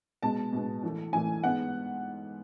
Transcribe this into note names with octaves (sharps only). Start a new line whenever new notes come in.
B2 G#3 B3 A5
B2 G#3 B3
A2 E3 A3
A2 E3 A3 G#5
G#2 G#3 B3 F#5